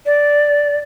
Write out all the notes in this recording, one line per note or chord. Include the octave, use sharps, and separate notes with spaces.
D5